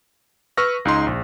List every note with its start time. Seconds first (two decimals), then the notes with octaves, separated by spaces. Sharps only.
0.57 B4 C#6 E6 F6 A#6
0.85 C#2 D#4 C6
1.07 A#1